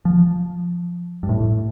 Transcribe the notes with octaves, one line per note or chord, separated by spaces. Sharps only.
F3
G2
A2